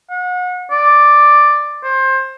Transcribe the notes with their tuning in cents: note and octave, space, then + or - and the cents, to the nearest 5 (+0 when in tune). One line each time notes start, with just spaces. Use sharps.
F#5 -35
D5 +5
C5 +20